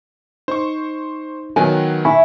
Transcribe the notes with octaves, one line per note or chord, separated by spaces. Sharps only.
D#4 C5 C#6
D#3 F#3 B3 G#5
E4 G#5 B5 C#6